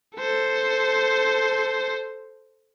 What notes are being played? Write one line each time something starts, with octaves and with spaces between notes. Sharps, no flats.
A4 C5